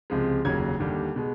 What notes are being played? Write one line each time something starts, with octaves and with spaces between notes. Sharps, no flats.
C#2 C3 F3 G#3
F1 D#2 C#3 F#3 G#6
D#2 D3 G3
B2 G#3